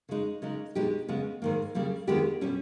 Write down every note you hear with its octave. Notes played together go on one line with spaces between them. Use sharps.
C#3 G#3 D#4
C#3 G#3 D#4
B2 G#3 D#4 G4
C#3 G#3 B3
G#2 D#3 A#3
C#3 G3 A#3
D#2 D#3 G#3 B3 G4
B2 G3 C#4